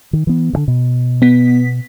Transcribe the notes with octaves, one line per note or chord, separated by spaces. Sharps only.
D#3
E3 B3
D2 D3
B2
B3 B6